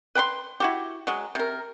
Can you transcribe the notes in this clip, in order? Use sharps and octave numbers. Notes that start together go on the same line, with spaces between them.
B4 G5 B5 C6
E4 F#4 G4
F#3 G#3
C3 A#4